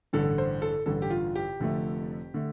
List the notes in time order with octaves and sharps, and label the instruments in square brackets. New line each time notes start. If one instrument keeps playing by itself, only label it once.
[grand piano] A1 G2 D3 A4
C5
A4
A1 G2 D3 A4
G4
F4
G4
F1 F2 D3 A3
D3 A3